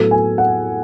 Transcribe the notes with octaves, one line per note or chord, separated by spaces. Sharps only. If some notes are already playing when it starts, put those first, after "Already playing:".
Already playing: A2 F#3 B3 A4
G#5
F#5